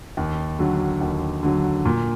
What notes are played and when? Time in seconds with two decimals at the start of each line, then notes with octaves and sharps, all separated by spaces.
0.17 D#2
0.59 D3 F#3
1.01 D#2
1.43 D3 F#3
1.85 A#2